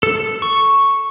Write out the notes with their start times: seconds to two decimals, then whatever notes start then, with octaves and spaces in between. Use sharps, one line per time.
0.03 A4
0.42 C#6